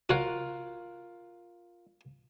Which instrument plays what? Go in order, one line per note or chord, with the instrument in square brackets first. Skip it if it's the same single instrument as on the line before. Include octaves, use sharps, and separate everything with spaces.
[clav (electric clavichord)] F4 A#4 [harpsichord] F#4 C#5 F#5